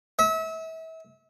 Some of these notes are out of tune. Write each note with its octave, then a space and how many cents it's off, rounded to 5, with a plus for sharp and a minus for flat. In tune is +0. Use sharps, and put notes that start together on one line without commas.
E5 -35